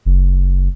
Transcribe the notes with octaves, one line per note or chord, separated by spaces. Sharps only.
F#1